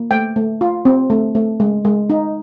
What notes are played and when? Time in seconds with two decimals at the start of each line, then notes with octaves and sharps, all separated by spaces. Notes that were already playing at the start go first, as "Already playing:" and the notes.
Already playing: A#3
0.11 A3 G5
0.36 A3
0.61 F4
0.85 C4
1.10 A3
1.35 A3
1.60 G#3
1.85 G#3
2.10 D#4